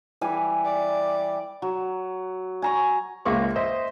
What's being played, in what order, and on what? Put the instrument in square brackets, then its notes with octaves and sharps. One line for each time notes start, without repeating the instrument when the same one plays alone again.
[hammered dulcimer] E3 G3 G#5
[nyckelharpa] D5
[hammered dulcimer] F#3
G#5 A#5 C#6
[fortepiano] C#2 G#3 A#3 E5 C#6 D6
C5 D#5 E5